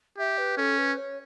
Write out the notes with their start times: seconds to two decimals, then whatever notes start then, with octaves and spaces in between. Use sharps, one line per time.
0.18 G4 E5
0.38 B4
0.57 C#4 A4
0.78 B4
0.97 C#5